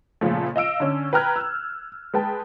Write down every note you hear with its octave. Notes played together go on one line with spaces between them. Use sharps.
A#2 C#3 F3 A3
D#5 F5 E6 D7
D3 C#4
B4 G5 A#5 F6 F#6 G#6
E6
G#3 B4 G5 A5